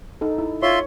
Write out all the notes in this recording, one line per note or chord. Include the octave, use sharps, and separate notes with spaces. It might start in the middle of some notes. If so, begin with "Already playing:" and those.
D#4 A4
E4
F4 C#5 E5 C6